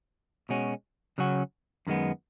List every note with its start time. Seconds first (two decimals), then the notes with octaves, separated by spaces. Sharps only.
0.49 B2 G#3 C#4 F#4
1.18 C#3 F#3 C#4 F#4
1.87 F#2 D#3 G#3 B3